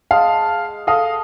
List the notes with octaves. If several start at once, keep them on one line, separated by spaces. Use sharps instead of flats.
G#3 F5 A5
A4 D#5 F5 A5